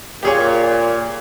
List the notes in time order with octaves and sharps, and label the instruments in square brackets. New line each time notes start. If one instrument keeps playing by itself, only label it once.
[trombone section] A#2 [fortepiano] G4 G#4 C#5